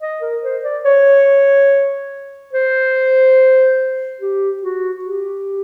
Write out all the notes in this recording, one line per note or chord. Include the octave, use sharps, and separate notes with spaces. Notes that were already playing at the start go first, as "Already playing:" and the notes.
D#5
A#4
C5
D5
C#5
C5
G4
F#4
G4